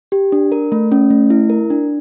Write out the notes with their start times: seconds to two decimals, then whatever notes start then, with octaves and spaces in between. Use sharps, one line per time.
0.12 G4
0.32 D4
0.52 A#4
0.72 A3
0.92 C#4
1.10 A3
1.30 E4
1.49 A#4
1.70 D4